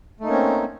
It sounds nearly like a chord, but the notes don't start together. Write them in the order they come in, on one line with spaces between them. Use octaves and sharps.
A3 D#4 A#3 C#4 C4